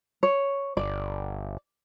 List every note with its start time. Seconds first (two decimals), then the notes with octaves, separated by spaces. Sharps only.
0.23 C#5
0.77 G1 D5